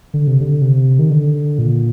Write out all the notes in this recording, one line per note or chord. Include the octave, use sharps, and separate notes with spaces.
D3
C3
D3
C3
D#3
D3
A#2